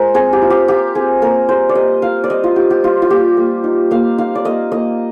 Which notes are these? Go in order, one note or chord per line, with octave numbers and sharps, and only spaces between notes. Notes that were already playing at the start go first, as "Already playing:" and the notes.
Already playing: G#3 F4 A#4 C5
C4 G#4
G4
F4
G4
F4 G4
C4 G#4
A#3 A#4
G3 C5
D5
G3 D#5
F4 F5
D5
G3 D#5
F4
F4 G4
G4
G3 F4
F4
A#3 G4
A#3
D#4
A#3 F5
D#4 F5
D5
A#3 D#5
A#3 D#5